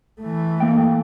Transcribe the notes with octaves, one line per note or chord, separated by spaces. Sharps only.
E3 A3
A#3 G5